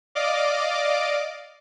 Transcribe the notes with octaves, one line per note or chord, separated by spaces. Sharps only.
D5 D#5 F5 D6